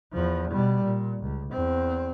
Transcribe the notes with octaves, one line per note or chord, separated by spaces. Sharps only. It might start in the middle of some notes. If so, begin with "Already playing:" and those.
E2 F3
B2 G3
A#2
C#2
E2 C4